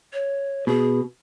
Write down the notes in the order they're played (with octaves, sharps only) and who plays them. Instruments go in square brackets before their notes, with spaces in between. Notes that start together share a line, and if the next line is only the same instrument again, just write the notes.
[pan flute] C#5
[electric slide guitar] B2 [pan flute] G#4